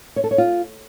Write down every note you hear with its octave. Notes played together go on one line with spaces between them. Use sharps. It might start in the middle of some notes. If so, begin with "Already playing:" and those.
C#5
A4
C#5
F4